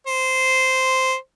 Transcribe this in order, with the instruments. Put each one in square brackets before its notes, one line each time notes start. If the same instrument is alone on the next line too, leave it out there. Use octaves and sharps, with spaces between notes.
[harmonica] C5